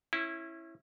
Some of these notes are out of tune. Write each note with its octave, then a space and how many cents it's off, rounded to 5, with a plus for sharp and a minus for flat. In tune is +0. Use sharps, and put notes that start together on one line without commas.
C#4 -25 E4 +0